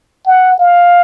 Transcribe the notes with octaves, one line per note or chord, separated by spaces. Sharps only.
F#5
F5